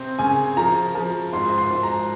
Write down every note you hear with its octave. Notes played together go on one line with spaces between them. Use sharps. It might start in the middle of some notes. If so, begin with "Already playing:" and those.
Already playing: C3 C4
C#3 G#5
F3 A#5
F3
G#2 C6
C6
G#2
A#5